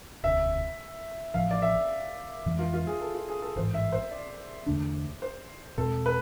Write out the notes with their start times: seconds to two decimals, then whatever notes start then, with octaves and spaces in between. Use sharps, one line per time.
0.23 E1 D2 C3 E5
1.34 A1 A2 F3 F5
1.51 D5
1.62 E5
2.46 F2 E3 G#3
2.59 F4
2.74 F4
2.87 G#4
3.01 A4
3.15 F4
3.29 G#4
3.42 A4
3.56 A1 G#2 E3 G#3 C5
3.74 E5
3.92 C5
4.11 D5
4.66 E2 D3 A3 D4
5.22 C5
5.77 E2 B2 G#3 C4 A4
6.06 B4